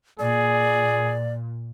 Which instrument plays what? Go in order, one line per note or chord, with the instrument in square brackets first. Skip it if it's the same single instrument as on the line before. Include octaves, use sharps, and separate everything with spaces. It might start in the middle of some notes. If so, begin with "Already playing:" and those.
[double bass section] A#2 [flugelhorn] G#4 [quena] D5